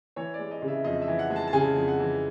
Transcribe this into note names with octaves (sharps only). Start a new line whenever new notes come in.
E3 C#5
D5
G#3
D#5
C#3
E5
F2 D#5
E5
E3
F#5
G#3
A5
A5
C#3 G#5
F2
F#5
E3